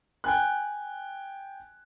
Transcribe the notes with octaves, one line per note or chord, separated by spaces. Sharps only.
G5 G#5 F#6